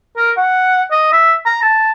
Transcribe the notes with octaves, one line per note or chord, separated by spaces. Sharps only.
A#4
F#5
D#5
E5
A#5
A5